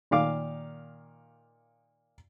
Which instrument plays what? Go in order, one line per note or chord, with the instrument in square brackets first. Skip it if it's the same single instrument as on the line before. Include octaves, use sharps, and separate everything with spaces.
[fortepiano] A#2 D#3 F5 D6